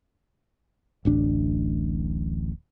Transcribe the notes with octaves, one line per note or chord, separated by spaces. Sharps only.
D1 A1 D4